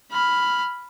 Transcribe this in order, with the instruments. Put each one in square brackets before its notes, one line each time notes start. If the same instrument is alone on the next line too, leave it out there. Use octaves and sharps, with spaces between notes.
[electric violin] B5 F6